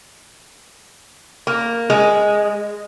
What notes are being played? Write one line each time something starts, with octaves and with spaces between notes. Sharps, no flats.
A#3
G#3